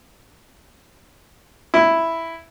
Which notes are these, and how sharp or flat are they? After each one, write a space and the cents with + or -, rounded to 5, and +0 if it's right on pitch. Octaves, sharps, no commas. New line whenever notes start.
E4 +0